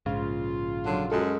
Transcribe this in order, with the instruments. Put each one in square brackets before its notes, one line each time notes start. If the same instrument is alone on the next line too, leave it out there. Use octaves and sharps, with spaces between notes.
[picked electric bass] A#1 C#3 [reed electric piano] G#2 [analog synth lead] F4
[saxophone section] D3 F#3
[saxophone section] F#2 G#3 F#4 [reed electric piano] A4